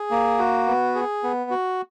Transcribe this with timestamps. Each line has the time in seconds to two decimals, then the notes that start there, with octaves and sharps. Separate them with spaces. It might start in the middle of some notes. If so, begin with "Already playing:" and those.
Already playing: G#4
0.11 A#3
0.39 F#4
0.67 B3
0.95 G#4
1.23 B3
1.51 F#4